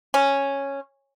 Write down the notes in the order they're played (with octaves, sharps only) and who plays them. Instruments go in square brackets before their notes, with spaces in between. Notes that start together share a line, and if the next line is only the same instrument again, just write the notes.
[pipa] C#4